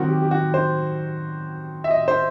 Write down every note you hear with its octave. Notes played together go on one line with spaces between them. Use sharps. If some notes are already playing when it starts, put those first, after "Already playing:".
Already playing: D#3 F#3 C4 F#4
G4
G4
F#4
C5
E5
D#5
C5